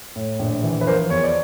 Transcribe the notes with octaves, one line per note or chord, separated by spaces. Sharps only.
A2
A#1
E3
B4
F3 A#4 C5
E2 C#5
D5